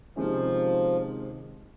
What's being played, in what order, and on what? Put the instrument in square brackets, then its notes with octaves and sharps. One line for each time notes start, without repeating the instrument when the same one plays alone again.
[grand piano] C3 D#3 G#3 C#4 [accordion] F3